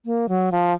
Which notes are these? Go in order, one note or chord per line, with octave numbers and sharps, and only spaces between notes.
A#3
F#3
F3